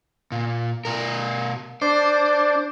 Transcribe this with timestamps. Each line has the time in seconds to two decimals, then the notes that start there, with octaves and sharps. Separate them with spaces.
0.32 A#2
0.85 B2 A#4
1.82 D4 C5